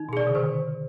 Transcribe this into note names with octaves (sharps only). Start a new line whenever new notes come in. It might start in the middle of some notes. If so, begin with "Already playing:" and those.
Already playing: D#3 D#4
B2
C3 G#4 D5
D3
C3 D#3 C5